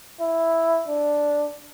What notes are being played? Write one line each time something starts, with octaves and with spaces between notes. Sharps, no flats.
E4
D4